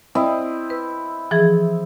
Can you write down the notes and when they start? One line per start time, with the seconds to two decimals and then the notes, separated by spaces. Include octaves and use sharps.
0.15 C4 E4 D#5
0.70 B4
1.31 E3 F3 G#4